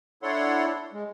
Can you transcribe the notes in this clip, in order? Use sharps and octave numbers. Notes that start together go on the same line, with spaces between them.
D4 E4 A4 C#5 F#5 C6
G#3